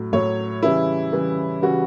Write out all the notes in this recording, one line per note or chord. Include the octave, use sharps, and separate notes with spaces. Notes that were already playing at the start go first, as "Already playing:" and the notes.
Already playing: A2 F#3
A2 F#3 C#5
C#3 E3 G3 E4
C#3 E3 G3
C#3 E3 G3 F#4